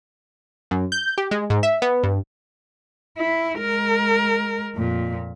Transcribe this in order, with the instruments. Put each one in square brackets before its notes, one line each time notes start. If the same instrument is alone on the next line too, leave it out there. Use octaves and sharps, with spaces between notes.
[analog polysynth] F#2
G6
G4
G#3
G#2
E5
B3
G2
[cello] E4
G#3 A#4
F2 A#2